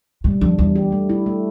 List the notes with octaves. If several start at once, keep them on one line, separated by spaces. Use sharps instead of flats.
A2 G3
F2 D4
E2 G3
G4
A3
E4
A3